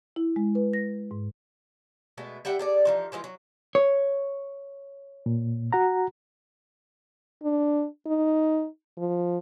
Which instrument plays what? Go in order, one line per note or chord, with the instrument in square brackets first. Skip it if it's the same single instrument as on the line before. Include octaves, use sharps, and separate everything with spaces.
[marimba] E4
G#3
B4
A#6
G#2
[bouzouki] B2 G#3 A3
G3 E5 F#5 G5
G#4 A4 D5
E3 F3 D#4
E3 F3 G#3 F4
F#3
[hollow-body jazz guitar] C#5
[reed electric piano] A#2
F#4 F#5 A#5
[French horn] D4
D#4
F3